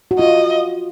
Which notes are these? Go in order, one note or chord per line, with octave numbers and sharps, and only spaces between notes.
F#4
F4 D#5